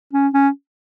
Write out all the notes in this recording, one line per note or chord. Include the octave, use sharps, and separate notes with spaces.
C#4
C#4